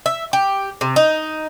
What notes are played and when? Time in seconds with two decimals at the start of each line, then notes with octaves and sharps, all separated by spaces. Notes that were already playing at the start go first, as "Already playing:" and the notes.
0.06 E5
0.33 G4
0.81 C3
0.96 D#4